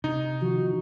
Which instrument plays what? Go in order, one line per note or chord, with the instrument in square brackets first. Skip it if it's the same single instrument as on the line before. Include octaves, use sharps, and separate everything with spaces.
[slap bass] C3 [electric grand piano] D#4
[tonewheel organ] D#3 F3 [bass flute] F#4